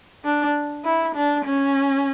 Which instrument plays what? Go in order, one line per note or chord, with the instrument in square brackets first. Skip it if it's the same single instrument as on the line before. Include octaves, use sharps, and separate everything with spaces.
[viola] D4
E4
D4
C#4